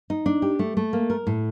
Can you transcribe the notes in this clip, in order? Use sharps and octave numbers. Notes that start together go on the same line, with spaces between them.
D#4
D4
G4
A3
A3
A#3
A#4
A2